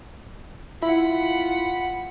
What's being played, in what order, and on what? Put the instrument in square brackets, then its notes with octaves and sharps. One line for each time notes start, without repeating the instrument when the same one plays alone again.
[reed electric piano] E4 [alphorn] F4 [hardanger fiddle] F#5 B5